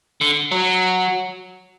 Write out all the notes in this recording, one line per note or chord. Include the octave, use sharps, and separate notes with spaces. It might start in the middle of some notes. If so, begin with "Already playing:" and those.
D3
F#3